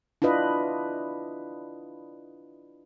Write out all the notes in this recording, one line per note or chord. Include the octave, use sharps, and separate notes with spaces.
D4 E4 F4 B4 D#5